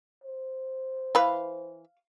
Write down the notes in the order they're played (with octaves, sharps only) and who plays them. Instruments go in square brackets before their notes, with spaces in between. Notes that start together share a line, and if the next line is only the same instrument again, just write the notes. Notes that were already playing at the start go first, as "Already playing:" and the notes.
[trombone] C5
[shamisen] E3 B4 [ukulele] F5